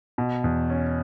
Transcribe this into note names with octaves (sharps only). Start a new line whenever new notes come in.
B2
E2
C#4